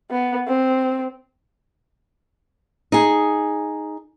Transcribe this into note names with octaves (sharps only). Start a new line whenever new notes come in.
B3
C4
D#4 G#4